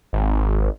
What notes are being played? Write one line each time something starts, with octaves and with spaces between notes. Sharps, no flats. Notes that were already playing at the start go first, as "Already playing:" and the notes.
G#1